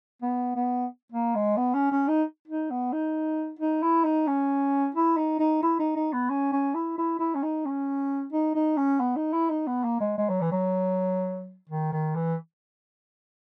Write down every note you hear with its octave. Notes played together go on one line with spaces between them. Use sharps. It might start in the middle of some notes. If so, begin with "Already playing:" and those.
B3
B3
A#3
G#3
B3
C#4
C#4
D#4
D#4
B3
D#4
D#4
E4
D#4
C#4
E4
D#4
D#4
E4
D#4
D#4
B3
C#4
C#4
E4
E4
E4
C#4
D#4
C#4
D#4
D#4
C#4
B3
D#4
E4
D#4
B3
A#3
G#3
G#3
F#3
E3
F#3
D#3
D#3
E3